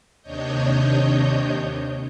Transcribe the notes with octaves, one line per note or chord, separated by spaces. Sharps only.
D#2 C3 D4 C#5 D#5 G6